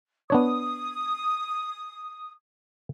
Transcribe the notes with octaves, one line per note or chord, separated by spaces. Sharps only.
B3 D4 C#5 D#6